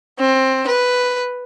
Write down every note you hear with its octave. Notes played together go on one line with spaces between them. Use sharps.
C4
B4